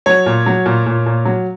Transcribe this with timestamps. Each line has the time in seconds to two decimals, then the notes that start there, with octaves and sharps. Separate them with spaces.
0.06 F#3 C#5
0.26 A#2
0.46 F#3
0.66 A#2
0.86 A#2
1.06 A#2
1.25 F#3